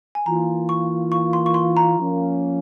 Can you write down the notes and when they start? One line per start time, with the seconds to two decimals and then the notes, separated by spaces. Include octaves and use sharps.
0.15 G#5
0.26 E3 A#3 F4 A#5
0.69 C#6
1.12 C#6
1.33 C6
1.46 C#6
1.54 C6
1.77 A#5
1.97 F3 A#3 C#4